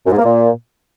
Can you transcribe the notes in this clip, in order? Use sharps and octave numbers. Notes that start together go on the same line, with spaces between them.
F#2
G#2
A#3
A#2